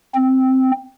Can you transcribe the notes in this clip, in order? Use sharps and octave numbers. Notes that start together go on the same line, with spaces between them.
C4